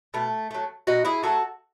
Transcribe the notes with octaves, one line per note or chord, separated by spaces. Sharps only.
B2 A3
F#3 A3
B2 D#4 F#4
E4 G#4
F#3 A3 F#4 A4